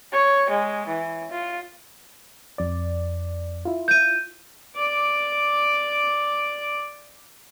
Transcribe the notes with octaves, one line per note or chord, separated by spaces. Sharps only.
C#5
G#3
E3
F4
F2 D5
E4 F4
G6 D#7
D5 D6